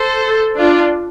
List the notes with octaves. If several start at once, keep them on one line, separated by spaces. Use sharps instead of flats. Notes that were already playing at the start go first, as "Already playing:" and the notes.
Already playing: A4 C5
D4 F4